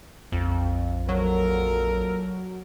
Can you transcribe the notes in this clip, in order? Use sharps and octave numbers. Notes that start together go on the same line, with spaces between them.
A#1 F2
A#2 F#3 A4 A#4